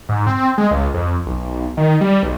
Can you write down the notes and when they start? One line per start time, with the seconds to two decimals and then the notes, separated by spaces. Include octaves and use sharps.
0.09 G#2
0.27 C4
0.58 G#3
0.71 C#2
0.94 F2
1.26 B1
1.77 D#3
2.01 G3
2.23 B1